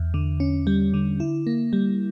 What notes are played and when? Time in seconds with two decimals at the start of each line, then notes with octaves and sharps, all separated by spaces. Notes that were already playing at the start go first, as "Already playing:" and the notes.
Already playing: E2
0.14 D3
0.40 C#4
0.67 G3
0.94 D3
1.20 E4
1.47 A#3
1.73 G3